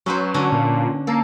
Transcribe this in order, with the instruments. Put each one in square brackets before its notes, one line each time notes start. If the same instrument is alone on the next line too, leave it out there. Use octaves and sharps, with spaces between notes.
[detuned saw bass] F#3 [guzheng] C#4 B4 C5
[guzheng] D3 C#4 D4
[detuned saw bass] A#2
[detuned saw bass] A#3 [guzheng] A4